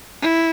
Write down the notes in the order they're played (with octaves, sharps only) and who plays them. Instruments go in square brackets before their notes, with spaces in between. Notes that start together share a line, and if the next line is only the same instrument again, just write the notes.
[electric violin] E4